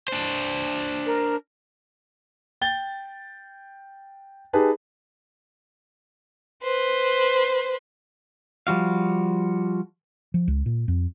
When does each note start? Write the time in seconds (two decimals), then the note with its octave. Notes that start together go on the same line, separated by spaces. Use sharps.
0.08 D4 C5
1.06 A#4
2.61 G5 A6 G7
4.53 D#4 G4 G#4 B4 A5
6.63 B4 C5
8.67 F3 G3 F#4 F5
10.34 F3
10.48 C#2
10.66 A#2
10.88 F2